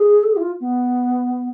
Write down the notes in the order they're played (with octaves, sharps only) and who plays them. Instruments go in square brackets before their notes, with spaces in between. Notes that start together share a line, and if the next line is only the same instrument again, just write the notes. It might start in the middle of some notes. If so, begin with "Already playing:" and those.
Already playing: [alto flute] G#4
A4
G#4
E4
F4
B3